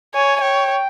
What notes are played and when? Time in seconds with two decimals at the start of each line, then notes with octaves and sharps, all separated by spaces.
0.14 C#5 G#5
0.36 G#5
0.41 C#5 G5